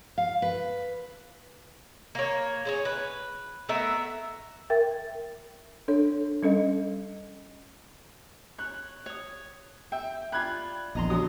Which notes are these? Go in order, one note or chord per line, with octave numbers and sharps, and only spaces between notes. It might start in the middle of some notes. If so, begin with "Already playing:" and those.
F5
B4
A#3 C#5
G#4 C5 C#5
B4
A3 B3 A#4 E5
A#4 E5 G5 A6
D4 A4 C#5
G3 C#4 A4 D#5
C#5 F#6
C#5 D#6
E5 G5
F4 D5 B5 F#6 G#6
A#1 E2 D#5 A#5 C6
D3 F#3 D#6